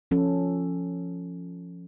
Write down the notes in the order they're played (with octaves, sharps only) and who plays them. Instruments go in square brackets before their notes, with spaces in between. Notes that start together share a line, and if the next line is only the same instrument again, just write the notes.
[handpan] F3 C#4 A4